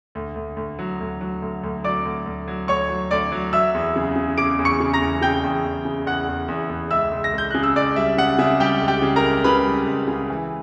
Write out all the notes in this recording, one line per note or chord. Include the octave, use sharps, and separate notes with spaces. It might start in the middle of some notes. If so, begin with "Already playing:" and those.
D2
D2
D2
F#3
D2
F#3
D2
D2
F#3 D5 D6
D2
D2
F#3
D2 C#5 C#6
F#3
D2 D5 D6
F#3
F#3 E5 E6
E2
C#3
C#3
C#3 D6 D7
E2
C#6 C#7
C#3
A#5 A#6
E2
C#3 G5 G6
E2
E2
C#3
E2 F#5 F#6
E2
E2
E2
C#2 E5 E6
C#2
A#6
C#2 G6
C#3 F#6
E6
C#2 D5 D6
G3 E5
C#3 F#5
C#3 E5
G3 G4 G5
C#2
G4 G5
C#3
A#4 A#5
C#2
C#3 B4 B5
G3
C#2
C#3
E3